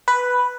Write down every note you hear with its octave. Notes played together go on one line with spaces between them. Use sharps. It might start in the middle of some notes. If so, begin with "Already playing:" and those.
B4